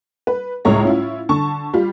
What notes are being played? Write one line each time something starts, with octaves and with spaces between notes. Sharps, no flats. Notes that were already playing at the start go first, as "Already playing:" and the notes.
B4
C#2 A2 G#3 C#5 A#5
C#4 E4 F4
D3 A5 C#6
G3 F4